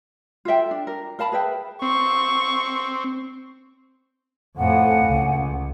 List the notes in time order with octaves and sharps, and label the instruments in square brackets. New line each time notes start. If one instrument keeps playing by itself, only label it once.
[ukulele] F4 A4 E5 G5
D4
A#4
A#4 F5 A5 B5
G#4 B4 E5 G5
[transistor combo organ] C4 [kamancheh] C#6
[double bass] F2 A2 [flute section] F5 F#5 G#5
[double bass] C#2